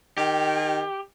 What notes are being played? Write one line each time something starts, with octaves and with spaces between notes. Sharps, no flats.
D#3 G4